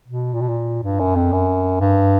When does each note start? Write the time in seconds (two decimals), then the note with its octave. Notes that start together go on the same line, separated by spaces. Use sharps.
0.08 B2
0.34 A#2
0.41 B2
0.49 A#2
0.83 G2
1.00 F#2
1.16 F2
1.33 F#2
1.81 G2